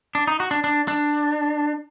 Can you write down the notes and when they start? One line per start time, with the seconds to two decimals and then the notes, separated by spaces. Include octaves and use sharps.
0.15 D4
0.27 D#4
0.40 F#4
0.51 D4
0.64 D4
0.88 D4